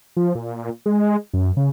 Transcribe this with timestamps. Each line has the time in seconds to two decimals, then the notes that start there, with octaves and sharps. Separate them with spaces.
0.17 F3
0.35 A#2
0.86 G#3
1.34 F#2
1.57 C#3